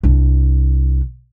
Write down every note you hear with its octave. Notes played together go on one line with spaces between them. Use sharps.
C2 D4